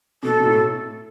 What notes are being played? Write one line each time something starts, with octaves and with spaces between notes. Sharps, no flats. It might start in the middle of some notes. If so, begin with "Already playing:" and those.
B2 A4
B2
A2